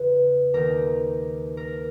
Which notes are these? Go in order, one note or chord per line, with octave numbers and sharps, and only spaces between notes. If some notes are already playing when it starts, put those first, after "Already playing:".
Already playing: E2 C#3 E3 B4
D#2 D#3 A#4
A#4